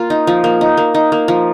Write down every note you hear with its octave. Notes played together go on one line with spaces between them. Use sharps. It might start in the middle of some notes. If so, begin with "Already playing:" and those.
Already playing: A#3 F4
D#4
F3
A#3
D#4
A#3
D#4
A#3
F3